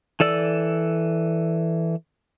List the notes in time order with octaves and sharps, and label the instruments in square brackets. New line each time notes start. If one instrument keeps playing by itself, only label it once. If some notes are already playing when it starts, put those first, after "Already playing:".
[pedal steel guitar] E3 A4 D5 E6